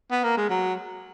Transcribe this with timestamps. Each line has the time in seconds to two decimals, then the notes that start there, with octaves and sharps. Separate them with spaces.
0.11 B3
0.24 A#3
0.37 G#3
0.50 F#3